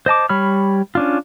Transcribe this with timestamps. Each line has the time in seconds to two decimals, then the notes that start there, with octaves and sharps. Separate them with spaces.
0.06 C5 D#5 A5 D6
0.29 G3 C#5 B5 F6
0.95 C#4 D4 F4